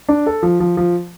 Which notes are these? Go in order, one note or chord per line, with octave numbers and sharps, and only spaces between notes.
D4
A4
F3
F3
F3